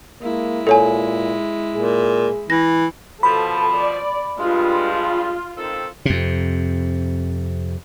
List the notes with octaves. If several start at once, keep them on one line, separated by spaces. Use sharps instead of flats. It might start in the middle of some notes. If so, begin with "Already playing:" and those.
G#3 A#3 E4
A#2 A4 C#5 G#5
A#2 G#4
E3 A#6
B2 F3 A4 B5
D5
G2 G#3 F4
D#3 C4 A4
F2 C3